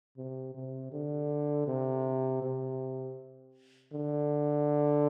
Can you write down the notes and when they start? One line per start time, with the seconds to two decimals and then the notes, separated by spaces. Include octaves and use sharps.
0.17 C3
0.55 C3
0.92 D3
1.67 C3
2.42 C3
3.93 D3